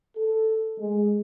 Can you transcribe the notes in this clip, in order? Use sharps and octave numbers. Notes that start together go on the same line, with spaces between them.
A4
G#3